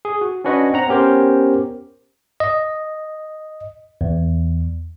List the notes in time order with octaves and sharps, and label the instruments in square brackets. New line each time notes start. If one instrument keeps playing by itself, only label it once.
[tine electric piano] G#4
F#4
C#4 D4 F#4 B4 C#5 D#5
C4 F#5 A#5
B3 C#4 G4 A#4 C5
D#5
E2